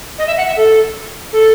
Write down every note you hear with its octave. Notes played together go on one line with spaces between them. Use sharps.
D#5
E5
F#5
E5
A4
A4